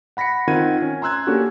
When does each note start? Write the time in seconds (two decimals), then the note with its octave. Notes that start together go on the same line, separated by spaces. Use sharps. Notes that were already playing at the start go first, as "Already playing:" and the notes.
0.17 F#5 B5 A#6 B6 C#7
0.47 D#3 C4 F4 F#5 G#6 D#7
0.82 C#4
1.02 A#5 C6 E6 F#6 G#6
1.27 A#3 C#4 D4 F#4 G4 A4